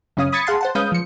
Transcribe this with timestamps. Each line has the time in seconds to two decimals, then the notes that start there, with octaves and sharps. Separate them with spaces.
0.17 F#2 C#3 C#4 F5 D#6
0.32 B5 D#6 G#6 A6 B6 C#7
0.47 G#4 F5 F#5 A5 C6
0.61 C5 F#5 A5
0.75 G#3 C#4 B4 F5 D#6 G6
0.92 F3 C#7